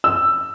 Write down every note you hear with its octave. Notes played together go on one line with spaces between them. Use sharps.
E6